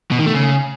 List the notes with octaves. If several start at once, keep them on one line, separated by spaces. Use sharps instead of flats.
B2
D#3
A3
C#3